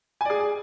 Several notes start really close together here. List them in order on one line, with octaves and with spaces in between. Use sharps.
G#5 D5 G#4